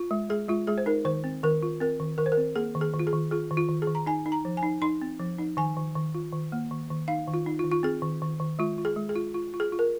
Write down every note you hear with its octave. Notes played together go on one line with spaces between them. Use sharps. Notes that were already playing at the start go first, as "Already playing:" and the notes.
Already playing: F4
G#3
G#3 G#4
G#3 F4
G#3 G#4
C5
D#4 A#4
D#3 C5
C4
D#3 A#4
F4
C4 A#4
D#3
D#3 A#4
C5
A#4
C4
A#3 G#4
D#3
G#4
D#3
F4
G#4
D#3
F4 G#4
D#3
F4
D#3
G#4
D#3
A#5
D#4 G#5
D#4
A#5
F3
G#5
D#4
D#4 C6
C4
F3
D#4
D#3 G#5
D#3
D#3
F4
D#3
A#3
D#3
D#3
D#4 F5
D#3
F4
D#4
F4
D#3
F4
C4 G#4
D#3
D#3
D#3
G#3 F4
F4
G#4
G#3
G#4
F4
F4
F4
G#4
F4
A#4